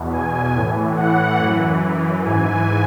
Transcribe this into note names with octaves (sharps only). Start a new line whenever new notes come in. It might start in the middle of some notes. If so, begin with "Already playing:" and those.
Already playing: E2 B2
G#5
A2 E3
F#5
F#2 E3
G#2 E3 G#5